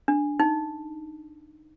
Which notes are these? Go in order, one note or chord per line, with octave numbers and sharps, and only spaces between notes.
D4
D#4